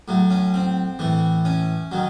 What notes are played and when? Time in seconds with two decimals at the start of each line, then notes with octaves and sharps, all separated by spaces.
0.08 A2 F#3
0.30 C#4
0.54 C4
0.99 A2 E3
1.45 C#4
1.92 D#3 F#3